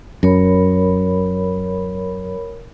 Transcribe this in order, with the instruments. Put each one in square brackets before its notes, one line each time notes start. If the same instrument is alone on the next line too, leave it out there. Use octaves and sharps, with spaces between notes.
[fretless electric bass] F#2 [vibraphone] A#4 C#5 B5